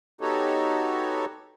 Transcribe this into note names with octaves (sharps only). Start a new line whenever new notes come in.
B3 D#4 F#4 G4 A4 C#5